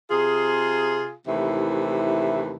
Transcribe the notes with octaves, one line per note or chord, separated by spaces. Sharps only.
C3 F4 G#4
D#2 C3 E3 A3 E4